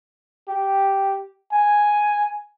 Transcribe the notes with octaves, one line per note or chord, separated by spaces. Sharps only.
G4
G#5